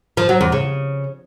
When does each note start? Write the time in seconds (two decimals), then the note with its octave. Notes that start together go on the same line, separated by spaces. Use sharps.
0.17 F3
0.29 F#3
0.41 E2
0.52 C#3